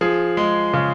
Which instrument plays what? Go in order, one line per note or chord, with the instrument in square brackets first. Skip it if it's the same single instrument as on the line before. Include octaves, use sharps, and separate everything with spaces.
[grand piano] F3 G#4
G#3
C#3